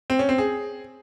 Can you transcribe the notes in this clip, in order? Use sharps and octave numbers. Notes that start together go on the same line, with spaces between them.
C4
C#4
C4
G#4